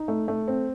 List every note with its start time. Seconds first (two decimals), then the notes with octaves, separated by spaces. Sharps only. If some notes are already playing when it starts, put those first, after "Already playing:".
Already playing: D#4
0.08 A3
0.28 A3
0.48 C4